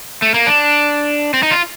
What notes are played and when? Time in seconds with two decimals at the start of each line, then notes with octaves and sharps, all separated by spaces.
0.22 A3
0.34 A#3
0.47 D4
1.34 C4
1.43 D#4
1.51 F4